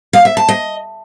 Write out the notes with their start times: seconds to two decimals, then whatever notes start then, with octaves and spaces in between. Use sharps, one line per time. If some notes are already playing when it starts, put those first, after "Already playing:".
0.13 F5
0.25 E5
0.37 A5
0.48 D#5